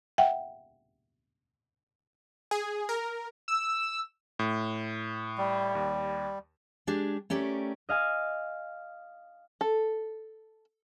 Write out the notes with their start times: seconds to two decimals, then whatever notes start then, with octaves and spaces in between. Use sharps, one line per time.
0.18 E5 F#5 G5
2.51 G#4
2.89 A#4
3.48 E6
4.39 A2
5.38 G3
5.75 D#2
6.87 G#3 D4 G4 G#4
7.30 A3 C#4 G4 A#4 D5
7.89 D#5 F5 G#5
9.61 A4